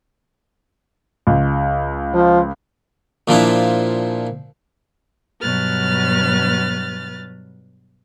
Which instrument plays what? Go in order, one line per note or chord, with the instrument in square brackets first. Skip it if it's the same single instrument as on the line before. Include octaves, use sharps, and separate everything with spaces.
[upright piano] C#2
[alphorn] F3
[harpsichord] A#2 F3 D4 E4
[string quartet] G2 B2 F#3 B4 F6 A6